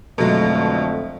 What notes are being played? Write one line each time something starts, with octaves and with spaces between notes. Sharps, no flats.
F2 B2 D3 F#3 G#3 A3